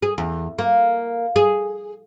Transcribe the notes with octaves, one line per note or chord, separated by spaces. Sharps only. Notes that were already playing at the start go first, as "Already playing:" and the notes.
G#4
E2
A#3
G#4